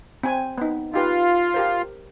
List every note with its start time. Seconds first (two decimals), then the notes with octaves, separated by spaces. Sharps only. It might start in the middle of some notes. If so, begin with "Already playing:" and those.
0.23 C4 G#5
0.58 B3 D#4
0.93 D#4 F4 G4 B4
1.54 G4 A#4 C5